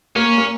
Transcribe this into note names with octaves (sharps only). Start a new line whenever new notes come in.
A#3 C#4
A#3